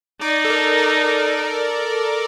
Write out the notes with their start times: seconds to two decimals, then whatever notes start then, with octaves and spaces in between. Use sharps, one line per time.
0.21 D#4 D5
0.45 A4
0.50 A#4
0.78 A#4
1.05 A4